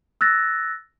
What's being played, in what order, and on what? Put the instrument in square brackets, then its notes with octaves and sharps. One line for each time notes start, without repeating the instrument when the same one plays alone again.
[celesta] E6 F#6 A6 A#6